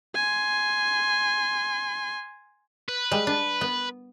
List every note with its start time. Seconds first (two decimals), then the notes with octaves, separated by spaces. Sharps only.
0.15 G#5 C6
2.88 B4
3.11 G3 G#3
3.27 D4
3.61 B3